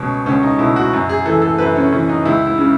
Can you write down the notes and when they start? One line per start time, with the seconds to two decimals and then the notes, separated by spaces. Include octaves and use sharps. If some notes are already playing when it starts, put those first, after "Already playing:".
Already playing: C#2 B2 C#4
0.26 C#2 C#4
0.43 D#4
0.59 B2 E4
0.76 F#4
0.93 F#2
1.09 G#4
1.26 E3 A4
1.42 A4
1.59 F#2 B4
1.76 C#4
1.92 E3 C#4
2.09 D#4
2.25 C#2 E4
2.47 E4
2.58 C#3